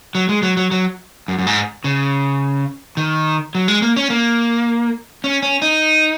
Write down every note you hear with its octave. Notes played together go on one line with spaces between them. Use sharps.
F#3
G#3
F#3
F#3
F#3
F#2
F#2
G#2
C#3
D#3
F#3
G#3
A#3
C#4
A#3
C#4
C#4
D#4